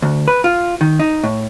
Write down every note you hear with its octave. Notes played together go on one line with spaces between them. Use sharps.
D2
B4
F4
D#3
D#4
A2